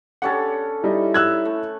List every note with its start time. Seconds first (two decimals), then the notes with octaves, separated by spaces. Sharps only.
0.22 D3 C#4 G4 A4 F#5
0.84 G3 D#4 E4
1.14 E6 F#6 G#6
1.45 A3